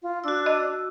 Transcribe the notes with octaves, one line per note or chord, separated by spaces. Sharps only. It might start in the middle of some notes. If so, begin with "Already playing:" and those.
F4
D4 F#4 E6
D#5